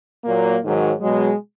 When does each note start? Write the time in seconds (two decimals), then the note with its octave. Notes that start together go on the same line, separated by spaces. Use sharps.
0.24 A#2 F#3 A#3
0.64 G#2 D#3 F#3
1.01 B2 F#3 G#3